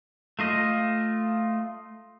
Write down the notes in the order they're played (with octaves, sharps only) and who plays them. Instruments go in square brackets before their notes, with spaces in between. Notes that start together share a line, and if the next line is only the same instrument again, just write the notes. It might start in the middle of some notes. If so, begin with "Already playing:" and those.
[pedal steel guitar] A3 F4 D#5